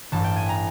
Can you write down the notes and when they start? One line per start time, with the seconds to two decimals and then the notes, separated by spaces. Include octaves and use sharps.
0.12 A1 G2 E3 A5
0.24 G5
0.36 G#5
0.49 A#5